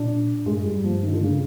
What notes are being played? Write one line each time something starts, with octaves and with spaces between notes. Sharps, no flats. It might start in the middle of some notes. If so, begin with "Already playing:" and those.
Already playing: A#2 D4
G#2 G#3
G2
F#2 G3
G2
F3
D#3
D3
C#3